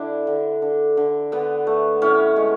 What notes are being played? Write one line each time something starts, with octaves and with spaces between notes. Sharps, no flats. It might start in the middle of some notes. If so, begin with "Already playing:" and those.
Already playing: D3 D4 E4
D3
D3
D3
D3 B3
A3
A2 C#4
G#3